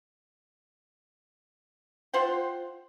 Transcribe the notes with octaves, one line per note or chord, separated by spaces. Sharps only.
F4 C5 F#5 G5